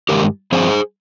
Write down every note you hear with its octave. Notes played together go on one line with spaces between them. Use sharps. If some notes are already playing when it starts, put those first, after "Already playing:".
G2 D#3 G#3 G4 A#4
G2 F3 C4 G#4 C5